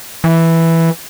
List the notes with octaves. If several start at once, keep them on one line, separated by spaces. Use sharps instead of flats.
E3